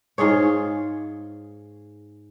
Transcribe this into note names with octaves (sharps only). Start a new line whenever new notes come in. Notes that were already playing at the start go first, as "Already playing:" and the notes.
G#2 F4 G#4 C#5